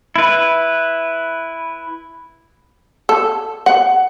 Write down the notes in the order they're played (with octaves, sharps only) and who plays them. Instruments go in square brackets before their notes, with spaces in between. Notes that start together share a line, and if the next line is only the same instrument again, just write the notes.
[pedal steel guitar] E4 B4
[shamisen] A4
F#5